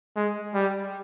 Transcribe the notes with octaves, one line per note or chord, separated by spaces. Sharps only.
G#3
G3